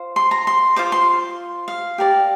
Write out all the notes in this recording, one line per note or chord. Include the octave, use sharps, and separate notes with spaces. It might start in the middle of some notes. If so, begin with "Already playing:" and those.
Already playing: F4 C5
C6
A#5
C6
F4 C5 D6
C6
F5
G4 A#4 D5